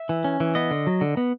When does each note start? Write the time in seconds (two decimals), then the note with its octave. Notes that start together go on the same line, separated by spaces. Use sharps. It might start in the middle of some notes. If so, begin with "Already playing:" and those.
Already playing: E5
0.09 E3
0.24 C#4
0.40 E3
0.55 B3 D#5
0.71 D3
0.87 F#3
1.01 D3
1.17 B3